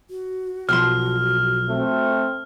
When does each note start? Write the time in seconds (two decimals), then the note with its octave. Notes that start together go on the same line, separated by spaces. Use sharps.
0.10 F#4
0.69 B1 F3 C6 F6
1.69 A3 C4